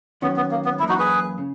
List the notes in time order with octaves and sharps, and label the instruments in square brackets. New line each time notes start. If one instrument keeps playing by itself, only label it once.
[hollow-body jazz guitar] D#3 F#3 C#4 [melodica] B3
[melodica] B3
A#3
B3
[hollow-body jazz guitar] F#2 E3 A#3 [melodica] E4
[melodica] D#4 F#4
G#4 B4
[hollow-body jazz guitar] C#3